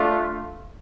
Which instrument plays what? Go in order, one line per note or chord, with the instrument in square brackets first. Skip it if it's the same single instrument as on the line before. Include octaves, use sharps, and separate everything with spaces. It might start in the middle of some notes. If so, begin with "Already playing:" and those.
Already playing: [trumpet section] A3 D4 F4